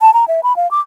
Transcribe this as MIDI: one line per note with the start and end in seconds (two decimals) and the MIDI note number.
0.01 0.13 81
0.14 0.25 82
0.28 0.40 76
0.43 0.55 83
0.56 0.69 77
0.71 0.80 86